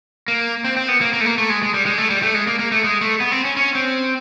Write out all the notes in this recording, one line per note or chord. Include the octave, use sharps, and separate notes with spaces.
A#3
C4
C4
B3
A#3
A#3
A3
A#3
A3
G#3
G#3
G3
G#3
A3
G3
A3
G#3
A#3
A#3
A3
G#3
A3
B3
C4
C#4
C#4
C4